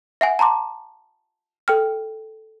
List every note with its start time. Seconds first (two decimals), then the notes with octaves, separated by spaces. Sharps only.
0.21 E5 F#5 G#5
0.39 A5 A#5 C6 D6
1.68 A4 G5 F6